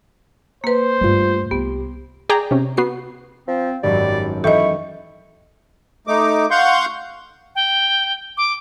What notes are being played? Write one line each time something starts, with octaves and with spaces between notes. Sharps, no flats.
A#3 B4 C5
G2 G3 A3 F4
C2 B3 G4
G#4 D5 G5 G#5 A#5
C3 C#4
B3 F#4 C7
F3 C4
G#1 F#2 G3 D5
E3 E4 A4 D#5 G5 C#6
A3 D#4 D6
F5 F#5 C6 C#6 G6
G5
D6